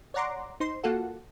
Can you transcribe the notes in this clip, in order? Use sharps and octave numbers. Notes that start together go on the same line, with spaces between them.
C#5 D5 F#5 A#5 C6 D6
D#4 C5 C6
A#3 F4 F#4 A4 F#5